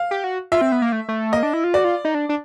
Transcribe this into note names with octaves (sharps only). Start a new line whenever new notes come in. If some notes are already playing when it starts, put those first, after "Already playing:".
Already playing: F5
G4
F#4
F4 E5
C4
B3
A#3
A3
A3
A#3 D#5
D4
E4
F4
F#4 D5
F4
D#4
D4
D4